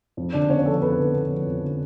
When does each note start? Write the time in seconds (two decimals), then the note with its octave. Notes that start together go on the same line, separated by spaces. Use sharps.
0.17 F2
0.33 D3 D4 D5
0.49 B3 C#4 C#5
0.65 F3 A4
0.82 F2 B3 B4
0.98 D3
1.14 B3
1.30 F3
1.46 F2
1.63 D3